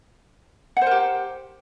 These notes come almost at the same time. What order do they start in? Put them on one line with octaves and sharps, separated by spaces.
F#5 C5 A#4 G4